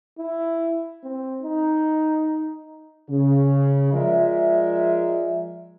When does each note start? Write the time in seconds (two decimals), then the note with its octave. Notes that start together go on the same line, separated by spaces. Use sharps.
0.18 E4
1.03 C4
1.43 D#4
3.10 C#3
3.94 F3 G#3 A#4 D5 E5